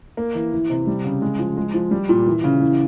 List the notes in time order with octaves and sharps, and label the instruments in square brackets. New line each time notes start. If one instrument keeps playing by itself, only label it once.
[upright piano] A#3
E3
E3
C3
G3
C#3
G#3
F3
G#3
F3
G3
A#2
E3
C#3
E3